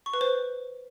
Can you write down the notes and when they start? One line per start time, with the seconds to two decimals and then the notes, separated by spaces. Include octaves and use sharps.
0.06 C#6
0.14 B4
0.21 C5